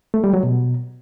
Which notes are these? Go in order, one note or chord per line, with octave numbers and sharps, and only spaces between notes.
A3
G3
F#3
B2